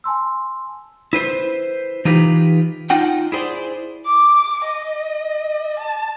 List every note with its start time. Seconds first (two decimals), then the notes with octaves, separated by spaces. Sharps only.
0.04 G#5 A5 C6 E6
1.13 E4 B4 C5
2.05 E3 D#4 F4 G4 B4
2.90 D#4 F4 F#5 G5
3.32 E4 G#4 C5 D5
4.06 D6
4.64 D#5
5.79 A5